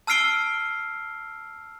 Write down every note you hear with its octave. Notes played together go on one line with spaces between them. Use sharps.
A5 E6 F6 C7 D7 G7